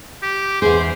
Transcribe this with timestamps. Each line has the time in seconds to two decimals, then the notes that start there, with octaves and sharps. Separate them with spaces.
0.23 G4
0.62 E2 G#4 C5